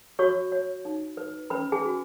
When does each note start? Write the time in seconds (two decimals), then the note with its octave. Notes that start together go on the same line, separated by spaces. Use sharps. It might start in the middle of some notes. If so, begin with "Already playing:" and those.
0.19 F#4 C#5 C#6
0.52 C#5
0.85 D#4
1.17 B4
1.50 C#4 B4 B5
1.72 G#4 G#5
1.83 F#4 B4